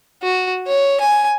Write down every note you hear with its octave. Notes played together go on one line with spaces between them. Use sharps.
F#4
C#5
G#5